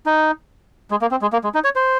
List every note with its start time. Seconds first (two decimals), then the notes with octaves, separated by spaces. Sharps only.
0.06 D#4
0.91 G#3
1.02 A#3
1.11 C4
1.22 G#3
1.33 A#3
1.44 G#3
1.54 D#4
1.64 C#5
1.76 C5